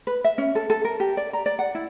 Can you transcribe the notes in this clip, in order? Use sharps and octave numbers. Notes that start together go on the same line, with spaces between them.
B4
E5
C#4
A4
A4
A#4
G4
D5
A#5
D5
F#5
E4